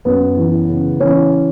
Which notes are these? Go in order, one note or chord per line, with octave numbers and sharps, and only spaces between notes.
F#2 B3
E3
C#3
E3 C#4